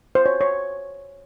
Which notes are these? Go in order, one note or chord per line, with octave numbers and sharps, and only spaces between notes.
C5
C#5
C#5